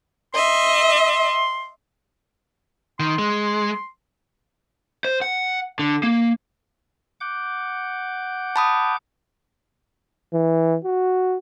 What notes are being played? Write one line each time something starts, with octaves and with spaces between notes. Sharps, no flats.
D#5 E5 C6
D#3 C6
G#3
C5
F#5
D3
A#3
F#5 D6 G6
A5 B5 D#6
E3
F#4